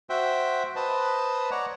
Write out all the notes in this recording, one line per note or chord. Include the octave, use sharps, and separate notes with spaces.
F#4 C5 E5 G5
B4 C5 D#5 A5
C#5 D5 F#5 A#5